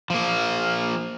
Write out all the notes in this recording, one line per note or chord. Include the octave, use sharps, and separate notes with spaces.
F3 A#3